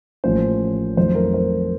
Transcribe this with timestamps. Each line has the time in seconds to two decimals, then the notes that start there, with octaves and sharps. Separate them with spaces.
0.24 A1 A2 F3 A#3 C#4 C5
0.97 F2 D#3 F#3 A3 C5
1.15 A#4
1.34 C5